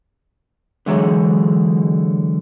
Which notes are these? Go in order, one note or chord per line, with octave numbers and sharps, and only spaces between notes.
D3 E3 F#3 G#3